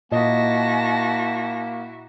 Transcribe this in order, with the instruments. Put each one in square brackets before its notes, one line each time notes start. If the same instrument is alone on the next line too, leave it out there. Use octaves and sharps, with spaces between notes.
[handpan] A#2 D#5 [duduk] A#3 [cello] E4 F#4 [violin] A5 A#6